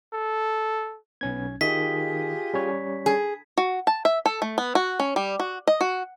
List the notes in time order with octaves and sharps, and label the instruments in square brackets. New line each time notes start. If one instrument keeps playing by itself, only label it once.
[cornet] A4
[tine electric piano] B1 C#4 G#6 [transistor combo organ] B3
[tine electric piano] D#3 [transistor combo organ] F4 G4 G#4 [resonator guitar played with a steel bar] D#5 [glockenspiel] B6
[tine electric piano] G3 C#4 C#5
[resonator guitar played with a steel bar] G#4
[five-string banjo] F#4
A5
E5
A4
A3
B3
F#4
C#4
G3
F#4
D#5
F#4